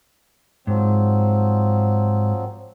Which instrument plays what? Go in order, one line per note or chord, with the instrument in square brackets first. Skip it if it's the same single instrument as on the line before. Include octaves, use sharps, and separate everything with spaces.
[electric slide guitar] G#2 [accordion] F3 F#3 C4